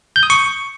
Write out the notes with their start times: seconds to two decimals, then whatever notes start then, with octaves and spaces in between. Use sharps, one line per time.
0.16 G6
0.23 D#6
0.30 C#6